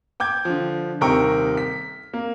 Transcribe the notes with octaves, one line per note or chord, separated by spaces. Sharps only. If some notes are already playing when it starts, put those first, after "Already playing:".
G5 D6 G6 G#6
D3 F3
D#1 C3 D#4 A#4 G5 C#6
B6
A#3